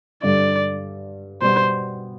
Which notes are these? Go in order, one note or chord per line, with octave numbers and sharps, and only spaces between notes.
G2 D3 G3 D5
B2 G3 B3 C5